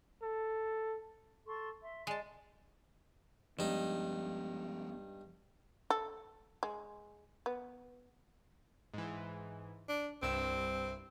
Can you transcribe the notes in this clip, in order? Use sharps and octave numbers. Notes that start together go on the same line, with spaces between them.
A4
A4 C6 C#6
E5 C6
G#3 D5 A5 C6
G2 F3 G#3 B3 D#4
A4
G#3
B3
G#2 E3
D4
C2 G2 C4 E6